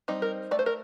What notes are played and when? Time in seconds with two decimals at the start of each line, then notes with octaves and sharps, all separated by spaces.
0.08 G3 C4 D#4
0.22 A#4
0.51 A3 D5
0.59 C5
0.66 A#4